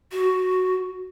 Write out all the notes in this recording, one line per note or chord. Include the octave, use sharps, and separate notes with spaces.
F#4